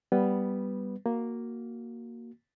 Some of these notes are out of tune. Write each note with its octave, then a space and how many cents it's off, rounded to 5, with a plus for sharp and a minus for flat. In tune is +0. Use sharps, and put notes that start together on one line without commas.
G3 +0 B3 +0 B4 +0
A#3 +0 F#4 +0